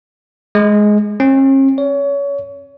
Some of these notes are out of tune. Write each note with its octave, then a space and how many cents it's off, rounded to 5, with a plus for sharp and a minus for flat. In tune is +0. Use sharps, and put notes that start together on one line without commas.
G#3 +10
C#4 -45
C#5 +30